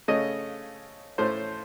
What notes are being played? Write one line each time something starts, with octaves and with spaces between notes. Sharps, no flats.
C#3 A3 C#4 D#5
A2 A3 C#4 C5